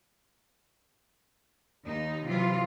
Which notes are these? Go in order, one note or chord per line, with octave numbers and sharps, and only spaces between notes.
D#2 D#4
C3 E3 F#3 F4